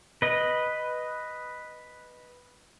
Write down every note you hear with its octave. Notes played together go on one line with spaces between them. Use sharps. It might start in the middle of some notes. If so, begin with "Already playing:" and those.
B4 D#5